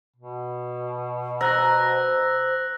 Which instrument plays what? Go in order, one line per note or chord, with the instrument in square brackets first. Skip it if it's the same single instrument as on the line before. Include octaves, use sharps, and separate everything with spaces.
[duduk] B2
[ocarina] C5 [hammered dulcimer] A#5 [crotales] E6 F#6 A#6